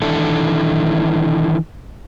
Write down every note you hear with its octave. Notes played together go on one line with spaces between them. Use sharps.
D#3 E3 D4 E4 A4